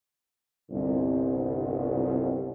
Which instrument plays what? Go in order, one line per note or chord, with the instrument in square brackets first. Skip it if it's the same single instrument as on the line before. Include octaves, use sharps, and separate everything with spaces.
[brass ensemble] G1 C2